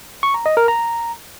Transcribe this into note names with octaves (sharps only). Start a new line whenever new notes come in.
C#6
A#5
D#5
A#4
A#5